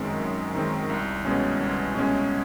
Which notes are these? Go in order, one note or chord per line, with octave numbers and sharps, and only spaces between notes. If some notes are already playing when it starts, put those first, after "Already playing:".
Already playing: F#2 D#3 G#3 C4
F#2
D#3 G#3 C4
C2
B2 G#3 C#4
C2
B2 G#3 C#4